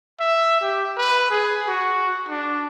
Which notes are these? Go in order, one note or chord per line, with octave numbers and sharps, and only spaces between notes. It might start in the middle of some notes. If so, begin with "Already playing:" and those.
E5
G4
B4
G#4
F#4
D4